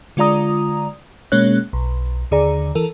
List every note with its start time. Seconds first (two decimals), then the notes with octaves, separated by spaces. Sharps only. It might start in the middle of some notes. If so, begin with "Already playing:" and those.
0.17 D3 G#3 F4 D5 A#5 D#6
1.32 B2 G#3 A#3 C#4 C#5 F#6
1.73 B1
2.31 D#2 D3 G#4 D5 A#5
2.75 E3 A4 A#4